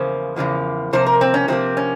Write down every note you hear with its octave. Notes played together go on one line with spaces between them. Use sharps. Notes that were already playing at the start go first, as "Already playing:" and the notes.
Already playing: E2 C#3 F3 A#3 C5
E2 C#3 F3 A#3
C3 F3 A#3 C5
A#4
C4
C#4
C3 F3 A#3 C4
C#4